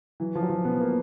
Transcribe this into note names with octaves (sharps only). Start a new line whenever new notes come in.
E3 F#3
F3
F#3
F3
B2 B3
A#3